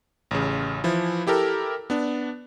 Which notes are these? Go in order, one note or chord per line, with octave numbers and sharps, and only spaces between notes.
A1 C#3
E3 F3 E4
E4 G4 A4 A#4
B3 D4